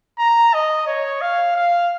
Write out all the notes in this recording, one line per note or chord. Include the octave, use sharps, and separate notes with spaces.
A#5
D#5
C#5
F5
F5